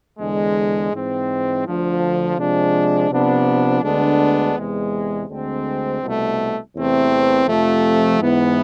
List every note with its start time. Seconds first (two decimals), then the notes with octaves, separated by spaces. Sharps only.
0.19 E2 D3 G#3
0.92 G#2 E3 G#3 C4
1.65 D2 D3 F3
2.38 C3 F3 G#3 D4
3.11 C3 F3 B3 D4
3.83 D2 D3 G#3 B3 D4
4.56 E2 C3 G#3 B3
5.29 D2 D3 G#3 C4
6.01 C2 B2 A3
6.75 E2 C3 E3 A3 C4
7.47 F2 C3 F3 A3
8.20 G#2 E3 B3 E4